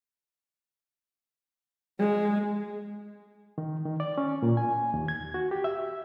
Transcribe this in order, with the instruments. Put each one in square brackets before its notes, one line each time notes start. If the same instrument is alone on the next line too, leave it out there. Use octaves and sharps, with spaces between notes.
[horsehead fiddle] G#3
[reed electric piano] D#3
D#3
D5
C#4
A#2
G#5
D#2
G#6
F#4
G4
E5